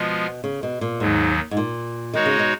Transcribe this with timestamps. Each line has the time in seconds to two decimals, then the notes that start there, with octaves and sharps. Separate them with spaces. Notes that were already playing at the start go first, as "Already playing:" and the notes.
Already playing: B2 F3 G#3 B3 F4
0.44 C#3
0.63 B2
0.81 A#2
1.00 D#2 G#2 D#3 F#3
1.51 G#2
1.57 A#2
2.14 D#3 G#3 D#4 F#4 C#5
2.26 C#3
2.39 B2